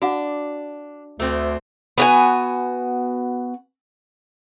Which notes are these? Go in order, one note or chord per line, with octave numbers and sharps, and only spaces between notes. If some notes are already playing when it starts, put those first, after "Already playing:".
D4 F#4 F5 F#5
D2 A3 C4
B3 F#4 G#5